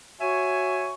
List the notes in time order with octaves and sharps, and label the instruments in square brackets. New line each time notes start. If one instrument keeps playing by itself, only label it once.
[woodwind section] F#4 C#5 E5 G#5 C#6